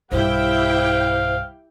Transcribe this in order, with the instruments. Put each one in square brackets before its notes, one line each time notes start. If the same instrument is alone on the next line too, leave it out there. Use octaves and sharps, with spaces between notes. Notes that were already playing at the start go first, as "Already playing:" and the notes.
[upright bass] B1 G2 [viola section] E4 G4 G5 [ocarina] C5 [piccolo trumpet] F5